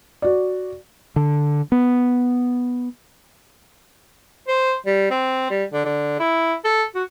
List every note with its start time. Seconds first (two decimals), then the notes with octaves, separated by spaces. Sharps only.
0.22 F#4 D5
1.16 D3
1.72 B3
4.48 C5
4.87 G3
5.11 C4
5.50 G3
5.73 D3
5.85 D3
6.20 E4
6.64 A4
6.95 F#4